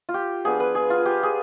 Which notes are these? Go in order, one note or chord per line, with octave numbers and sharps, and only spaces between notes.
F4
G4
F3 B3 D4 G#4
B4
G#4
F4
G4
G#4